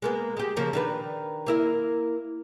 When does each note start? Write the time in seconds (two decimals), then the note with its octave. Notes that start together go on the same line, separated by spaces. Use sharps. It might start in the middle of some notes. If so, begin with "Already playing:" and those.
0.02 G#3 A#3 B3
0.37 G#3 G4
0.56 C#3 F3 A#3
0.73 D#3 D4 B4
1.46 A#3 E4 A#4